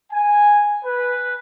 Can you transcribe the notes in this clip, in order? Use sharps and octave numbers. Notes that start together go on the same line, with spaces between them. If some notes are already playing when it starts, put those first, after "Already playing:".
G#5
B4